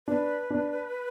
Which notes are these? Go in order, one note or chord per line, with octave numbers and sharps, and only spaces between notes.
D4 B4
D4